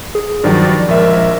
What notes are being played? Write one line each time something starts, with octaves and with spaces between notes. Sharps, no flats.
G#4
G2 D#3 F3 F#3 D5
A#1 G#3 A#4 E5